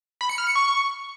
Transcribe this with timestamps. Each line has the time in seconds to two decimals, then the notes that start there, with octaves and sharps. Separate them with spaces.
0.21 B5
0.29 C#7
0.38 F6
0.47 C#7
0.56 C#6